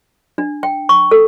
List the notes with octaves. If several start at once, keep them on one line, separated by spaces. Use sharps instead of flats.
D4
G5
C#6
A4